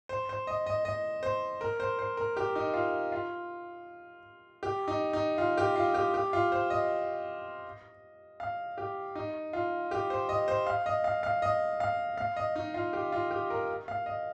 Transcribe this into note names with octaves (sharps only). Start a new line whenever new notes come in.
C5
C5
D#5
D#5
D#5
C5
A#4
C5
C5
A#4
G4
D#4
F4
F4
G4
D#4
D#4
F4
G4
F4
G4
G4
F4
C5
D#5
F5
G4
D#4
F4
G4
C5
D#5
C5
F5
D#5
F5
F5
D#5
F5
F5
D#5
D#4
F4
G4
F4
G4
A#4
F5
D#5